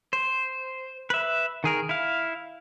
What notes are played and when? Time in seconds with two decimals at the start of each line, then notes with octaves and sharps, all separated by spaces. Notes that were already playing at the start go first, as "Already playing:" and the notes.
0.13 C5
1.10 B4 E5
1.64 D#3 G#4 A#4
1.89 E4 F5